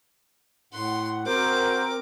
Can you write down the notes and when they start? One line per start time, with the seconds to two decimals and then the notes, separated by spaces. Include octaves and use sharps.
0.73 A2 F#5 C6
1.26 C4 F#4 A#4 C5 D6